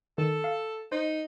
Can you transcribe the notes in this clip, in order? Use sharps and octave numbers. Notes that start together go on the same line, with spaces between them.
D#3 A4
F5
D#4 C5